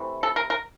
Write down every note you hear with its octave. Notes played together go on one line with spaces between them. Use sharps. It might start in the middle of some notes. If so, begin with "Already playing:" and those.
Already playing: C3 E3 A3
A4
A#4
A#4